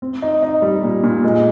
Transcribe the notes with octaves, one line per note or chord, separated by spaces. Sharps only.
C4
D#4
D#4
G3
A#2
A#2
G#3